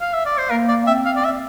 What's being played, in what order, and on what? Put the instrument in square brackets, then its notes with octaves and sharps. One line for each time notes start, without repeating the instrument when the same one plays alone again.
[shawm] F5
E5
D5
C5
[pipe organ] A#3 [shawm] A#4
[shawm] D5
[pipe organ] C4 [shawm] E5
[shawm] F5
D5
E5